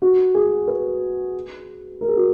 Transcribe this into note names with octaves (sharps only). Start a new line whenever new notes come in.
F#4
G#4
B4
A#4
G#4
F#4